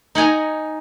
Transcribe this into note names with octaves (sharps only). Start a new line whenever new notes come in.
D#4 F#5 G#5 A#5